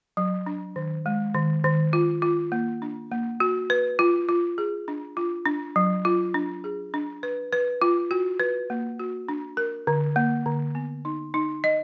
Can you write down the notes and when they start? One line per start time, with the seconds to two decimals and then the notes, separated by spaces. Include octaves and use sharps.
0.17 F#3
0.46 D4
0.76 D#3
1.06 G#3
1.34 D#3
1.64 D#3
1.93 F4
2.22 F4
2.52 A#3
2.82 D4
3.11 A#3
3.40 F#4
3.70 B4
3.99 F4
4.29 F4
4.58 G#4
4.88 D4
5.17 F4
5.46 D4
5.76 F#3
6.05 F4
6.34 D4
6.64 G#4
6.94 D4
7.23 B4
7.53 B4
7.82 F4
8.11 F#4
8.40 B4
8.70 A#3
9.00 F#4
9.28 D4
9.57 A#4
9.87 D3
10.16 A#3
10.46 D3
10.75 B3
11.05 D#4
11.34 D#4
11.64 D#5